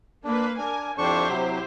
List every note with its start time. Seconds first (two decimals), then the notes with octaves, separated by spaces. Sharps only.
0.24 A#3 D4 B4
0.58 D4 A#4 G#5
0.98 F2 D4 E4 G4 C5 C#6
1.29 C3 F#3